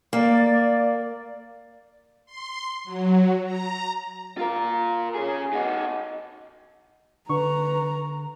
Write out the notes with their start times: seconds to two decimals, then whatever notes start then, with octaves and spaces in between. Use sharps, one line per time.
0.13 A#3 D5
2.26 C6
2.84 F#3
3.45 A#5
4.38 F4 A#4
5.15 C#4 G#4
5.53 D#4 F#4
7.29 D3 B4 A#5 C#6